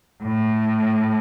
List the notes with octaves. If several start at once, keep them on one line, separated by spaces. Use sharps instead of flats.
A2